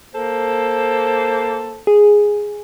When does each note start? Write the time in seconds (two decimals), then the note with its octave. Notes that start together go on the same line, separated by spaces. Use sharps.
0.14 A#3 A4 C5
1.87 G#4